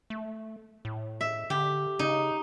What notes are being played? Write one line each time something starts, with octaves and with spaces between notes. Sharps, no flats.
A3
A2
E5
D3 G4
C#3 D#4